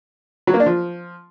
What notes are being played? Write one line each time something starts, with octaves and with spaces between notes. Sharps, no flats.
F#3
A#3
D4
F3